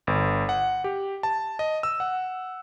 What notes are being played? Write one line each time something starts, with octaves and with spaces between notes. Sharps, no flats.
G1
F#5
G4
A5
D#5
E6
F#5